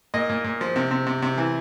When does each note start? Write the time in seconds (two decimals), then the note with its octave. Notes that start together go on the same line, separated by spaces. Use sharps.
0.14 A#2 D#5
0.29 A#2
0.44 A#2
0.61 F3
0.76 C3
0.91 C3
1.07 C3
1.22 C3
1.38 E3